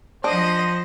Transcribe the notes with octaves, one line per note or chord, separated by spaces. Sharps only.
F3 D4 C5 D#5 F#5 A#6